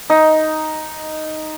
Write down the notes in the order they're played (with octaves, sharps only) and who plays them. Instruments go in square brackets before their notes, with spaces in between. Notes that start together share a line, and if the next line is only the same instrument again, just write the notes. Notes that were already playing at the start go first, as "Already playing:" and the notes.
[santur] D#4